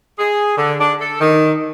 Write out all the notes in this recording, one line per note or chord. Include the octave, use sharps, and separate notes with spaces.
G#4
D3
D4
A4
D#3